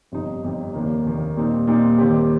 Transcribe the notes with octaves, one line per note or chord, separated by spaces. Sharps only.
G1 F2 C3 G3 D#4
G1 F2 C3 G3 D#4
F1 D#2 D#3 A#3
F1 D#2 D#3 A#3
A#2 G3 C4 D#4
A#2 G3 C4 D#4
D#2 D#3 G3 C4 G4